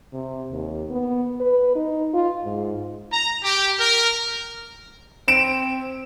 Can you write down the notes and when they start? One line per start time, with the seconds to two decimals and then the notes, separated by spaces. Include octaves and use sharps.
0.13 C3
0.51 D#2
0.90 B3
1.40 B4
1.76 D#4
2.14 F4
2.44 G#2
3.11 A#5
3.44 G4
3.79 A#4
5.28 C4 D7 E7